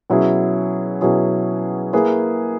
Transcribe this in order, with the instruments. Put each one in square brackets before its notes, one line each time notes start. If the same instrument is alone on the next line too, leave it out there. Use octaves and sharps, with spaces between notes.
[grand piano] B2 F#3 C#4 E4 G#4
B2 F#3 C#4 E4 G#4
A#3 E4 G#4 B4